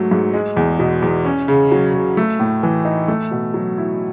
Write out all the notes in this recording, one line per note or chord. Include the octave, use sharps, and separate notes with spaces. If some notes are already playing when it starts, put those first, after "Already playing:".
Already playing: G#2 F#3 A3
G#2
G#3
E2
B2
E2
C#4
C#3
F#3
C#3
A3
A2
E3
D#4
A3
B2
F#3
E4